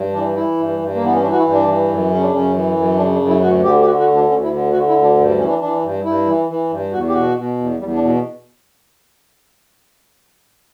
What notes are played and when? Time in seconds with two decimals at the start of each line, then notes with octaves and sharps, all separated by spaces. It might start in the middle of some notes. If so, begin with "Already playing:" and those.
Already playing: G2
0.13 E3 D4
0.35 E3 E4
0.57 G2
0.79 G2
0.95 A#3
1.01 E3 B3
1.13 C#4
1.22 E3 D4
1.32 F#4
1.38 E4
1.45 G2
1.52 D4
1.67 E3
1.89 F#2
2.11 C#3 C#4
2.21 D4
2.33 F#2 C#4
2.55 E3
2.76 F#2
2.97 C#3 D4
3.13 D4
3.20 F#2
3.28 E4
3.42 D2 F#4
3.64 D3 G4
3.81 G4
3.85 D3 F#4
4.00 F#4
4.07 D2
4.15 D4
4.29 D2 C#4
4.43 E4
4.52 D3
4.73 D3 F#4
4.88 E4
4.95 D2
5.02 D4
5.17 G2
5.28 G3
5.39 E3 C#4
5.49 D4
5.61 E3 D4
5.83 G2
6.04 G2 E4
6.26 E3
6.49 E3
6.70 G2
6.92 E2 F#4
7.08 G4
7.13 B2 F#4
7.36 B2
7.58 E2
7.80 E2 G3
7.95 D4
8.02 B2